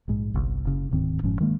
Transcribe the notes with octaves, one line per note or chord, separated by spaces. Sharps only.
A#1 G#2
G1 C2
F#1 C#3
D1 G#2 D#3 C4
F1 G#2 F3 C#4
D#3 G#3 A#3